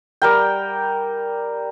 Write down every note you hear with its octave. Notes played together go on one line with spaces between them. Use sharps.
G3 A#4 G5